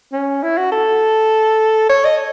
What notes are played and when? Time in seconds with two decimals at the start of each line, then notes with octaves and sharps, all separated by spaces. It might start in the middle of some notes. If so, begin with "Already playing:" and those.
0.13 C#4
0.43 E4
0.57 F#4
0.72 A4
1.89 C#5
2.05 D#5